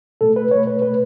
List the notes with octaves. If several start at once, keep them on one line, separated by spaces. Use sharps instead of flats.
B2 A3 A4
B4
B2 A3 C#5
B4
B2 A3 B4